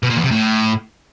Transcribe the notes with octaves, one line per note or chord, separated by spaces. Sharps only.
B2
A#2
E2
C3
A2